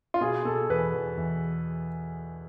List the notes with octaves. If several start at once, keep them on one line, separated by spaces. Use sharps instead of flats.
F4
B2 G#4
B2 A4
E2 B4
E2
E2